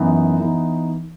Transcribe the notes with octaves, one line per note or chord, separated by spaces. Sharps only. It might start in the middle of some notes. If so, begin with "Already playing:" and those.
Already playing: F#2 E3 B3 D#4
E3 B3 D#4